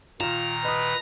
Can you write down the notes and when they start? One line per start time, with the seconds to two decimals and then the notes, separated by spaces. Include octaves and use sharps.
0.20 A#2 D#3 F4 A#5 E7
0.64 B4 D#5 D#6